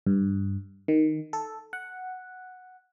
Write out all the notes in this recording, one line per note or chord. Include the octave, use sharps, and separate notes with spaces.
G2
D#3
A4
F#5